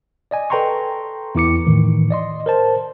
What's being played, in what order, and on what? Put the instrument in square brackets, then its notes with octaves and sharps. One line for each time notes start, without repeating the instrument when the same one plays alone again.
[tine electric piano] D5 D#5 G#5
A4 B4 G5 A#5 C6 C#6
E2 E4 D6 C#7
A2 D#3 E3
D5 D#5 C6
A#4 C5 A5